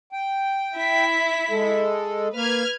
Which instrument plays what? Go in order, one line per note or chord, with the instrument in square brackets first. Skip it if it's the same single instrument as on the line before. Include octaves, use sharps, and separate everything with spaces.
[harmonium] G5
[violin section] E4 B6
[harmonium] G#3 A4
[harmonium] A#3 [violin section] B4 F6 G#6